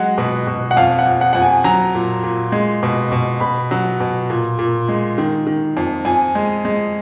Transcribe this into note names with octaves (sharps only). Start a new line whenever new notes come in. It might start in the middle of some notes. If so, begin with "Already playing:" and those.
Already playing: F#3 G#3 F#5
B2
B2
F#5
F2 F5
F#5
F2
F#5
F2 F#5
G#5
F#3 A#5
A#2
A#2
G#3
B2
B2
B2 B5
F#3
B2
A#2
A#2
G#3
D#3
D#3
F2
F2 G#5
G#3
G#3